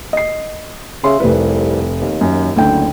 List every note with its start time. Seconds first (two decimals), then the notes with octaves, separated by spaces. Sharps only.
0.13 D#5 C7
1.04 C#3 E5 C6
1.20 F1 C2 B4
2.01 D#2
2.21 F#2
2.56 F#1 D2 D3 G5